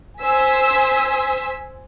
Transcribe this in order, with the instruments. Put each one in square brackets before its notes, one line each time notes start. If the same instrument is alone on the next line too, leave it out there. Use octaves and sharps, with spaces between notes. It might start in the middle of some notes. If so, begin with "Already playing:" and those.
[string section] C5 G#5 E6 B6